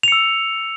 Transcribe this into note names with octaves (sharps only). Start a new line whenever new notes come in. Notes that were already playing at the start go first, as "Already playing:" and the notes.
E6 C#7 F7